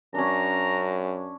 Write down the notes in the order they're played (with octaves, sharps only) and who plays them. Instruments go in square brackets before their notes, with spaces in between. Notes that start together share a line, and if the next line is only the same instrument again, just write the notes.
[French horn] F#2 [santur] C#4 D4 [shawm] A#5